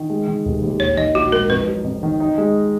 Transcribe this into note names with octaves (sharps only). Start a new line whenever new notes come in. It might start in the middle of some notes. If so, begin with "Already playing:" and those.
Already playing: D#3
G#3
D#3
F1
D#2
A#1 C#5
D#3 D#5
A#1 F#4
G#2 A#4
F2 B4
F#3
F2
D#3
D#4
G#3